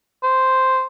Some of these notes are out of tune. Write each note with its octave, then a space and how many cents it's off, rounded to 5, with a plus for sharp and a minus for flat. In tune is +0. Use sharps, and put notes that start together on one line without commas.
C5 -5